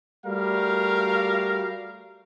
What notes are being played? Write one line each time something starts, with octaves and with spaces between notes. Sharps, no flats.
G3 A3 F#4 A#4 F5